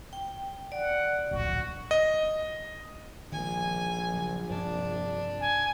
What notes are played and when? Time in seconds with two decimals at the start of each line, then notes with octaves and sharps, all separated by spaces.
0.13 G5
0.72 D5 F#5
1.31 D1 A#1 F#4
1.91 D#5
3.32 A#1 D#3 G#3 D4 G#5
4.14 C#3 F#3
4.50 G2 C3 D4
5.40 G#5